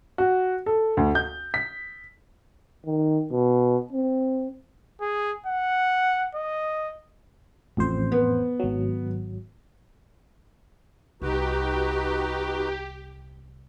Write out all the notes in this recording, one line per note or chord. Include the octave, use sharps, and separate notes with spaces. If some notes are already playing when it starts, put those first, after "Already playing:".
F#4
A4
D2
G6
B6
D#3
B2
C4
G#4
F#5
D#5
A1 F2 C5
B3
G#1 F#3
C2 D#4 F#4 G4 B4